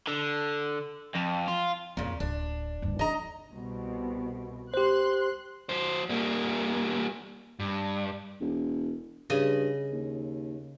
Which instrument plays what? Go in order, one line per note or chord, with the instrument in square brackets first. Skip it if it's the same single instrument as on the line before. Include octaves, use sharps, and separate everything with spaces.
[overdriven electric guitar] D3
F2
F4
[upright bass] F2 [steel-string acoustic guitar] A#2 C#3
[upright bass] D1 [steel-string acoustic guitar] D4
[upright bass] D2 G2
[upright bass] D4 D#4 [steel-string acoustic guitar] D#5 A#5
[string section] C2 B2
[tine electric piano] G4 C5 [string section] C6 F#6
[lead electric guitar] F#3 C5
G3 A#3
G2
[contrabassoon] E1
[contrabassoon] G2 [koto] C#3 D#5 G#5
[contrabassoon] D#2